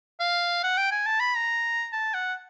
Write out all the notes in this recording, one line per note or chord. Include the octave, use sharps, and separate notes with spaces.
F5
F#5
G5
G#5
A5
B5
A#5
A5
F#5